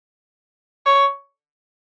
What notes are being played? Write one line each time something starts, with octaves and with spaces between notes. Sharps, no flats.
C#5